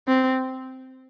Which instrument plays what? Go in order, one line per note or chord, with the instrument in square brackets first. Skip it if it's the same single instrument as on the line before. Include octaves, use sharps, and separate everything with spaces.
[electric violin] C4